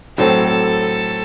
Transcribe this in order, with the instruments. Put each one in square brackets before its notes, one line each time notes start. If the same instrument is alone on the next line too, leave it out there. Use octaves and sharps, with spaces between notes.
[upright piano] A2 F#3 C4 [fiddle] A4